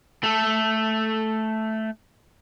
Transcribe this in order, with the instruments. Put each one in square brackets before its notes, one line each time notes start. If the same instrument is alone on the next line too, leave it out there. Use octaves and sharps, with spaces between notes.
[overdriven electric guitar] A3 A4